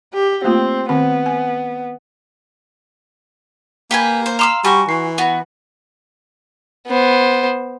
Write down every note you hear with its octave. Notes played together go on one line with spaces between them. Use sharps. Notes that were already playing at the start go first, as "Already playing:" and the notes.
G4
A3 A#3 C4 F4
D#3 B3 C4 B5
G#5
A#3 G4 B4 G#5
C5
F5 A#5 C6 D6 E6 E7
G3 F#4 G#5 C#6
E3 C7
B3 F#4
B3 C5